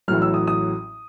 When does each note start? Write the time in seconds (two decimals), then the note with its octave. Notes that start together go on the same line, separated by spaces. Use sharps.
0.08 A1 A2 F#3 F6
0.22 E6
0.34 D#6
0.47 D#6